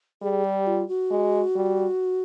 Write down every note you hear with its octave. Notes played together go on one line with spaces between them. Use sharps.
G3 G#4
G4
F4
F#4
G#3
G3